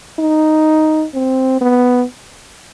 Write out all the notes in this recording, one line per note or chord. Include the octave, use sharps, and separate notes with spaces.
D#4
C4
B3